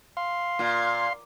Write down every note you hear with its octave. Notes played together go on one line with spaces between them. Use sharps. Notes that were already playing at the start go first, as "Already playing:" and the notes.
F5 C6
A#2